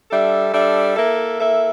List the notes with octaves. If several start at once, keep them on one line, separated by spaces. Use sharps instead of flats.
G3 D4 A4 E5
G3 D4 A4 E5
A#3 E4 A4 E5
A#3 E4 A4 E5